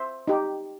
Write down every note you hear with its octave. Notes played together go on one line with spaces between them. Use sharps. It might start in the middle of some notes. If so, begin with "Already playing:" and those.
Already playing: C5 E5
D#4 G4